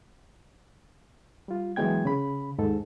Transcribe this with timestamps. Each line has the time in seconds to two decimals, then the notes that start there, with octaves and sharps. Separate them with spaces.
1.48 G3 F4
1.76 E3 F#3 G#3 B3 G5 G#6
2.05 C#3 B5
2.58 D#2 G#2 A4